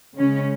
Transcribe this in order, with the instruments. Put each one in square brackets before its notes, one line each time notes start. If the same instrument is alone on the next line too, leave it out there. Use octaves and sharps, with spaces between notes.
[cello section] C#3 G#3 C#4